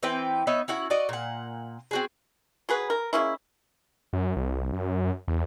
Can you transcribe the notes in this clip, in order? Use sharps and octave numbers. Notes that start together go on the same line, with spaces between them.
E3 C4 B4 G5
B3 D#4 C#5 E5
C#4 E4 F#4 F#5
F#4 D5 D#5 F#5
A#2 F#5
C4 F#4 G#4
F#3 G#4 B4
A#4
G#3 A#3 C#4 E4
F#2
C2
F#2
E2